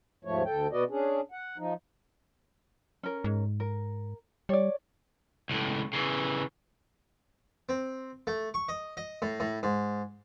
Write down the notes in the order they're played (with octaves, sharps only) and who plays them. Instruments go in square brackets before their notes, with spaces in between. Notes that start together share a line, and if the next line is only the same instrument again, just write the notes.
[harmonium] D#2 G#2 F3 A3 C#5
D2 A4 G5
B2 B3 F#4 D5 D#5
C#4 D4 G#4
F#5
F3 D#4
[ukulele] C#4 A#4
[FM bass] G#2
[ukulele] A#4
[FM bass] G3 [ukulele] C#5 D5
[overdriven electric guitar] C#2 A2
C#3 E3
[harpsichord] C4
A3
C#6
D#5
D#5
A2
A2
G#2